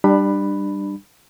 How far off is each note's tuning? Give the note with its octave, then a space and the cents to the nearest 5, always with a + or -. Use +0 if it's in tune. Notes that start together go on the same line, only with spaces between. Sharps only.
G3 +0 D4 +25 B5 +0